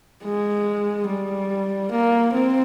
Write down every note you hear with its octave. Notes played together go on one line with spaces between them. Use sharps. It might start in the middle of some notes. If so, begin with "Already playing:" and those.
G#3
G3
A#3
C4